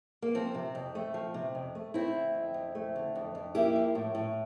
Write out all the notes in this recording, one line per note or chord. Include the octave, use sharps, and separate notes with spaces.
A#3
F3 C4
C3
F2
A3
F3
C3
F2
A3
A3 C4 E4
D3
F2
F2
A3
D3
F2
F2
A#3 E4 G4
F3
A2
A2